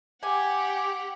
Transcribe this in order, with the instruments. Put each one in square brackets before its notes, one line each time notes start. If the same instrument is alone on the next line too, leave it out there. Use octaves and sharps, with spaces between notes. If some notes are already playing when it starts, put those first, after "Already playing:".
[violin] G4 F#5 [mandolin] G#5 [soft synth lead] D6